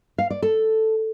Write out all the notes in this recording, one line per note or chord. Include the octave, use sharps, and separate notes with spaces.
F5
D5
A4